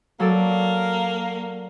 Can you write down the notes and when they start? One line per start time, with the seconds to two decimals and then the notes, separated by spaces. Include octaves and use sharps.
0.20 F#3 A#3 A4 D5